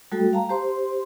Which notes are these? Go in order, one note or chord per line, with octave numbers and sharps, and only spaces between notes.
G3 A3 F#4 A4 G5
F5 A5 A#5
G4 C5 C6